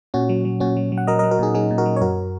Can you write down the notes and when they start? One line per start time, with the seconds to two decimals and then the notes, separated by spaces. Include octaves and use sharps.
0.14 A#2 C#4 F#4
0.29 F#3
0.45 F#3
0.60 A#2 C#4 F#4
0.77 F#3
0.92 F#3
0.98 F#5
1.07 F#3 A#4 D#5
1.19 A#4 D#5
1.23 F#3
1.31 F#4 A#4
1.39 A#2 D#4 G#4
1.55 F#3 D#4 G#4
1.71 A#2
1.78 F#4 A#4
1.86 F#3
1.96 C#5
2.01 F#2 F#4 A#4